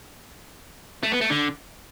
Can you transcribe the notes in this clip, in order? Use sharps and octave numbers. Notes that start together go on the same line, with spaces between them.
A3
B3
A3
D3